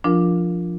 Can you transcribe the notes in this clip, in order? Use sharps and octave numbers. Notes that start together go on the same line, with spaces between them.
F3 D4 F4 A#4